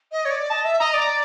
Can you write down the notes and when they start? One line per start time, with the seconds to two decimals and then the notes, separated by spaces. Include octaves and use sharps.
0.12 D#5
0.25 C#5
0.31 D5
0.50 D#5 A5
0.64 E5
0.79 D#5 A#5
0.94 D5